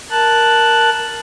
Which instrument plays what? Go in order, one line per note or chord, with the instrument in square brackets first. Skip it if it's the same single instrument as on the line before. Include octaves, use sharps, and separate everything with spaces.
[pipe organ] A#4 A5 F#6